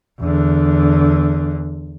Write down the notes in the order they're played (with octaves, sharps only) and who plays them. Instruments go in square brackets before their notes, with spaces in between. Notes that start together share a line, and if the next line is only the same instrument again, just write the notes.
[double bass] E2 D3